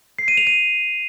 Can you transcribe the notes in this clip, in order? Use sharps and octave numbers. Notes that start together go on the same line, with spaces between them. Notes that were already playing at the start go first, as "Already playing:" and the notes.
C7
D#7
F7
D#7